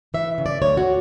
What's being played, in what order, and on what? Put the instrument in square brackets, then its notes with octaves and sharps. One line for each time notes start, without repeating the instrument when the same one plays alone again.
[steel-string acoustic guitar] E3 E5
C#3
D5
D2 C#5
F#4